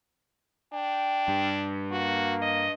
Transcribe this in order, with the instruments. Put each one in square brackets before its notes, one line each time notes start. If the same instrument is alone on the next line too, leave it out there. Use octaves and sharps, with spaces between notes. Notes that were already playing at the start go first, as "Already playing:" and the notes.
[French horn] D4 [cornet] G5
[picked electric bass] G2
[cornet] A#3 [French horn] F#4
[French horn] D#5